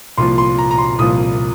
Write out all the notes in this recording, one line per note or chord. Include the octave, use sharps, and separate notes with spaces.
C2 A#2 F3 C6
C6
A#5
A#5
C6
C2 A#2 F3 D#6